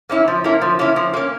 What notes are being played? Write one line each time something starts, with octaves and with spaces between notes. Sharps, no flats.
A#3 C#4 E4
F3
A#3 C#4 E4
F3
A#3 C#4 E4
F3
A#3 C#4